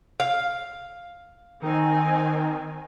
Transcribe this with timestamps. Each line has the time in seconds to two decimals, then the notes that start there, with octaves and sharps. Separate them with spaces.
0.20 F5
1.62 D#3 C4 D#4 G#5